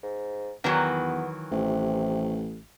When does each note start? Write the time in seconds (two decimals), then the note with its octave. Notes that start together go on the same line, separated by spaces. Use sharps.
0.03 G#2
0.64 E2 D#3 E3 F#3 B3
1.52 A1 C3